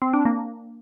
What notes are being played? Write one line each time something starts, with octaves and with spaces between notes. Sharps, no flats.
C4
D4
A#3